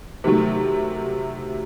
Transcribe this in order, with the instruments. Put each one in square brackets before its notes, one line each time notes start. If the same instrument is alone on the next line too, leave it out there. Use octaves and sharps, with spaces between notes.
[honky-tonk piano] C3 D#3 F#3 A3